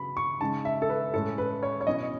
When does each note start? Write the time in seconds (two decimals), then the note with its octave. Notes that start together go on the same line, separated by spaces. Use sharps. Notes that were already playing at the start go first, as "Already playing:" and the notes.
Already playing: C#3 F#3 B3 B5
0.17 C#6
0.41 C#3 G#3 D#4 A5
0.65 E5
0.82 A4
0.89 B4
1.14 A2 G#3 C#4 E4 A4
1.38 B4
1.63 C#5
1.81 C#5
1.87 B2 F#3 C#4 E4 D#5